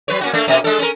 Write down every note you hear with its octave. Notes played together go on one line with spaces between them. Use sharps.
F#3 B4 C#5
A#3 C#4 F#4
A3 A#3 D4
B2 A#3 C#4
G#3 D4 A4
C#4 A#4